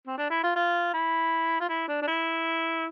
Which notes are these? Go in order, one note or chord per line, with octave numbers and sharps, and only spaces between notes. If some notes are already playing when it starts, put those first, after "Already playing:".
C4
D4
E4
F4
F4
E4
F4
E4
D4
D4
E4